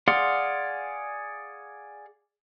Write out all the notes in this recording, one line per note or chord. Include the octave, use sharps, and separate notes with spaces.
G#4 D5 F5 F#5 C6